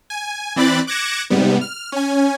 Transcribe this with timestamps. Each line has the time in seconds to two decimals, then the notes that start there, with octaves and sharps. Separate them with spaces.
0.10 G#5
0.56 E3 C4 D5 B5 F#6 A6
0.87 D6 F#6 G#6 A#6 C#7 E7
1.30 G#2 C3 G3 B3
1.61 F6
1.92 C#4 G#5